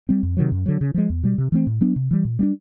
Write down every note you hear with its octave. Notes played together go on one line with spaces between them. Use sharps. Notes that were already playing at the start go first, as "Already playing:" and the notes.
G3 C4
F2
C3 D#3 F#3
F#2
D3 F#3
C#3
F3 G#3
E2
B2 G3
C3
E3 A3 C4
A2
F#3 B3 D4
C3
E3 G3
A#2
G3 B3 D4